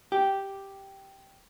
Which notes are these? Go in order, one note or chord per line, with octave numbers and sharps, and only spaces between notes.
G4